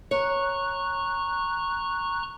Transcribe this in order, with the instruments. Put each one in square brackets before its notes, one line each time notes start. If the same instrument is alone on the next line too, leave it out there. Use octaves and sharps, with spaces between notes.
[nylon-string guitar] C#5 [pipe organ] A#5 C#6 F#6